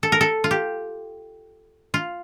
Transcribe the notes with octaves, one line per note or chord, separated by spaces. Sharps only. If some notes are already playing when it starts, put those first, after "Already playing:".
A4
A#4
A4
F4
G4
F4